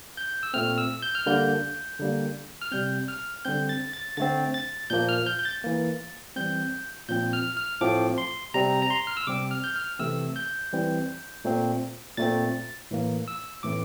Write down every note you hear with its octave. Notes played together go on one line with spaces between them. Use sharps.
G6
E6
A#2 A3 C4 F6
E6
G6
F6
D3 G3 A#3 G6
D3 G3 A#3
F6
C3 G3 C4 G6
F6
D3 G3 C4 G6
A6
A6
D3 A3 C4 A6
A6
A#2 F3 A#3 G6
F6
G6
G6
A6
E3 A#3
E3 G3 C4 G6
A#2 F3 C4 G6
F6
F6
A2 F3 A3 C4 D6
C6
C3 G3 C4 A#5
A#5
C6
F6
E6
C3 G3 C4 D6
F6
G6
F6
C3 E3 A3 C4 E6
G6
E3 G3 C4
A#2 A3 C4
A#2 A3 C4 A6
A2 E3 A#3
E6
A2 E3 A3 C4 D6